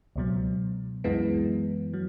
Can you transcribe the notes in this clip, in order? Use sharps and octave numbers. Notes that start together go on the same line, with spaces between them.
C#2 B2 F#3
F#2 E3 G#3 B3
F#3